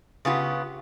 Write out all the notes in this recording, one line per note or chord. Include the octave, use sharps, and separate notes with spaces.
C#3 B3 F4 G4